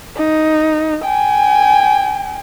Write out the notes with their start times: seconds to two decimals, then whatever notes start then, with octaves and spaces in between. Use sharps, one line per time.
0.17 D#4
1.04 G5 G#5